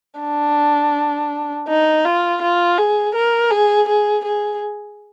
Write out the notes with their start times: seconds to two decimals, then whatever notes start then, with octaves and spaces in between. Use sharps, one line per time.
0.20 D4
1.68 D#4
2.05 F4
2.42 F4
2.78 G#4
3.15 A#4
3.51 G#4
3.88 G#4
4.25 G#4